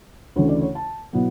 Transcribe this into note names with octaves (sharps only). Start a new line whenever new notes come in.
D2 C#3 E3 A3 C#5
D5
C#5
A5
B2 F#3 B3 E4